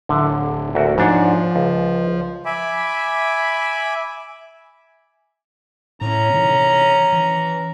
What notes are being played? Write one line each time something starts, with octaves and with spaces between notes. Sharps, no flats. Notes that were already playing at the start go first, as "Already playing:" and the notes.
D1 D3 E5
D2 F#4 A#4
G#2 F3 D4 C#5
C#2
E5 G#5 B5 D6
A2 C#4 A#5
C3 D#3 E3
E3